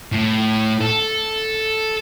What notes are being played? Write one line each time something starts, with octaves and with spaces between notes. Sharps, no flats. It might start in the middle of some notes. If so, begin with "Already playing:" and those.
A2
A4